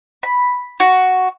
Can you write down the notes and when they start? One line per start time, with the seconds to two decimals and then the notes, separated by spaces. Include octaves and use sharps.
0.23 B5
0.80 F#4